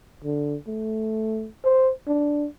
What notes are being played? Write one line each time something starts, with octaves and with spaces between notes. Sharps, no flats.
D3
A3
C5
D4